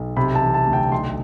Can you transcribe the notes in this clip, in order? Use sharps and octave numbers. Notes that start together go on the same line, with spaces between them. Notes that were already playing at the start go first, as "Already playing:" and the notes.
Already playing: B1
C3 B5
A5
E3
A5
D2
G5
B1 C6